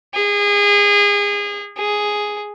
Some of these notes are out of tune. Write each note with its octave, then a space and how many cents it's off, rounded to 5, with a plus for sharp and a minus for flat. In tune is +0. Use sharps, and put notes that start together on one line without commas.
G#4 -30
G#4 +0